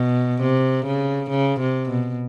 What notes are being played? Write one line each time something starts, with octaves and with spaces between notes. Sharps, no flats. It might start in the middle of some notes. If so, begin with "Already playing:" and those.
Already playing: B2
C3
C#3
C#3
C3
B2